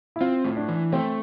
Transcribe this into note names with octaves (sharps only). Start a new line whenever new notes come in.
E4
C4 F4
A2
D4
E3
A3 C4